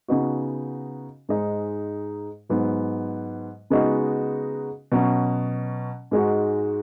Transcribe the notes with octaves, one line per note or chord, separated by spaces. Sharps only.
C#3 B3 D#4 F#4
G#2 G#3 D#4
G#2 F#3 B3
C#3 G#3 B3 D#4 F#4
B2 F#3 C#4
G#2 G#3 D#4 F#4